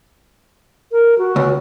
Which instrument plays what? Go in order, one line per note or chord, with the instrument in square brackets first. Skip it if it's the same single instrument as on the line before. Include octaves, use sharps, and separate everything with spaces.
[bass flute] A#4
F#4
[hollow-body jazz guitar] C#2